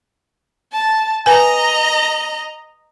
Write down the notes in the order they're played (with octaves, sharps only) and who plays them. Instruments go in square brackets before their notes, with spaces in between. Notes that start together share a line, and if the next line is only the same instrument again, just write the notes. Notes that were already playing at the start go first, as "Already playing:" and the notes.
[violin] A5
[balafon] B4 G#5 [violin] D#5 A#5